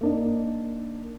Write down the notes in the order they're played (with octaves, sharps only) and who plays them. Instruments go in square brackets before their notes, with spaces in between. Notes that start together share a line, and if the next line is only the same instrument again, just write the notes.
[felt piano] A#3 D4 D#4